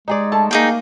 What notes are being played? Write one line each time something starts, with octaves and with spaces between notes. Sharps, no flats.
G#3 D#4 G#4 D5
A3 A4 A5
A#3 B3 D#4 G#4 G5